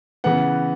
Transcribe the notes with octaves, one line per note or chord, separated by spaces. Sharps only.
C#3 E3 B3 F#5